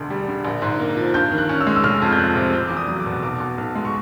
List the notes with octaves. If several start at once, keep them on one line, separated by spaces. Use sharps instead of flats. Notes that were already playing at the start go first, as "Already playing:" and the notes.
Already playing: E1 D2
G3
D3
A#1
G#2
A#3
F3
G2 G6
D#3
F#6
C#4
E6
G#3
E6
F1 F6
F2
G6
F3 F#6
C3
F1 G6
E2 D6
D#6
F#3
D6
B2
B1 D6
B2
B1
G#3
C#6